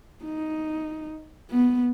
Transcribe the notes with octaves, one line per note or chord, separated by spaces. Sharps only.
D#4
B3